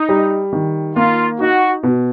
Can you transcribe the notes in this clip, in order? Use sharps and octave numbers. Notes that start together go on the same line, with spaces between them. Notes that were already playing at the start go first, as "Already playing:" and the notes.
Already playing: D#4
G3
D#3
A#3 F4
D#4 F#4
B2